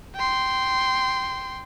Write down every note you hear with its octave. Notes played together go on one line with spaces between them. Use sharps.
G5 C6